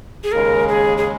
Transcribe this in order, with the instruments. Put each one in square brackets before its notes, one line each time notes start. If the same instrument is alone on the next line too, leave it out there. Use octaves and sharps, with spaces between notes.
[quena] G#4
[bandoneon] D#2 C#3 G#3 [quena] A#4
[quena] G#4
G#4